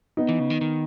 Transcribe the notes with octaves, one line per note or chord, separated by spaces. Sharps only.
B3 D#4
E3
C#3
D#3
D#3